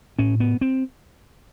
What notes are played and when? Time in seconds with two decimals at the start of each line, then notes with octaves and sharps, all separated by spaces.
0.19 A2 C#4
0.40 B3
0.61 C4